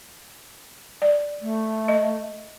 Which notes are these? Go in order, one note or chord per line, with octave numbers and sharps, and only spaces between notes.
D5
A3
D#5